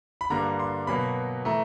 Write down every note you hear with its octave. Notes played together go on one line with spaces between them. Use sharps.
B5
G2 D3 G3 A#3 A#5
C6
B2 F#3 A#3 B5
E3 A3 A#5